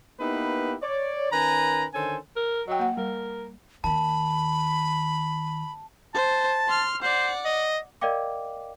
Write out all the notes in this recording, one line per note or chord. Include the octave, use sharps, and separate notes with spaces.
A#3 B3 D#4 E4 G4 B4
C#5 D5
D#3 C#4 A#4 B4 G#5 A#5
D3 D#3 C#4 A4 C5 G#5
A#4
F#3 D#5 G5
A#3 F#5
G3 A#4
D#2 D#3 A5 B5
C5 A5
C6 F6
C5 D5 F#5
D#5
A#4 D5 D#5 F5 G5 D6